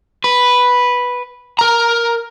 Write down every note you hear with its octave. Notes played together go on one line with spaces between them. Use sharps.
B4
A#4 A#5